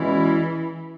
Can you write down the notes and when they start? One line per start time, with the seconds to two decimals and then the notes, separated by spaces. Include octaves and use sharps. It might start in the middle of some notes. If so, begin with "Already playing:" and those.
Already playing: E2 B2 E3 G#3 C#4 E4